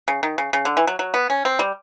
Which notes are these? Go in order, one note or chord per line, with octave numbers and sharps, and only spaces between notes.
C#3
D#3
C#3
C#3
D3
E3
F#3
F#3
B3
C#4
C4
G3